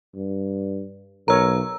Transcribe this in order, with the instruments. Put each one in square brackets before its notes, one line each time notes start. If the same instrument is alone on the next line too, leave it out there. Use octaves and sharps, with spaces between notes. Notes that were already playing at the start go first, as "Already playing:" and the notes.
[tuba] G2
[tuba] B1 [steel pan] A#4 C#5 [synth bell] A#5 E6